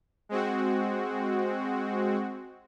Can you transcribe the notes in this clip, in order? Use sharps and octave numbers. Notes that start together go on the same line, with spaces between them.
G#3 C4 F#4